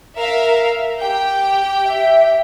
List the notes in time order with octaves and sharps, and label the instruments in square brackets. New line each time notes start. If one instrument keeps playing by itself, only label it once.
[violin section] A#4 E5 F5
G4 G5
[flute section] E5